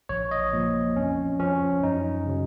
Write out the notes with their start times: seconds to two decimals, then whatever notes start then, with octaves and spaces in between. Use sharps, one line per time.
0.09 A#1 C#5
0.31 D#5
0.53 A#2 F3
0.96 F2 C#4
1.40 F3 C#4
1.82 F#2 D#4
2.26 C#3 F#3